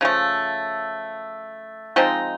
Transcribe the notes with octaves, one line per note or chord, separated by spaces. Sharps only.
C#3 F3 A3
F3 G#3 C4 D#4